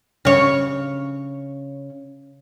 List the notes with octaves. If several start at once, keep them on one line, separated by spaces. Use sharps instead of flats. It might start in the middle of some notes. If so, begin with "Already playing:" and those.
C#3 C#5